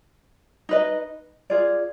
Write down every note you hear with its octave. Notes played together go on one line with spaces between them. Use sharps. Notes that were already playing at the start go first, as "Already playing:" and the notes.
D#4 B4 D#5
F4 G#4 D5